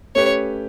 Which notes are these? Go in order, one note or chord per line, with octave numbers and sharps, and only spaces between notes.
A3 C#4 G4 B4 C#5